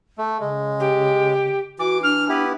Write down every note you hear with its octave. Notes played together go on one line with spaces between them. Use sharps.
A3
C#3 G#3
G4
E3 F#4 D6
D4 F6
B3 E4 G4 B4